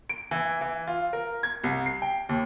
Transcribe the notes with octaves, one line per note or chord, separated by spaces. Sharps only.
D7
E3
E3
F4
A#4
G#6
C2
C7
G5
D#2